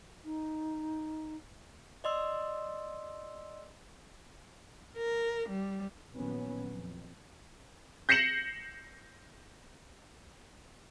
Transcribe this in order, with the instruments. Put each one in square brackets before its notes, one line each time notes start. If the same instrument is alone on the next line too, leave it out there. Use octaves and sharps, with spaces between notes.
[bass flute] D#4
[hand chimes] D5 D#5 C6 E6
[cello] A#4
G3
[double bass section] A#1 A#2 D#3 F#3 B3 C#4
F2
[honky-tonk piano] G6 A#6 C7 C#7 E7 F#7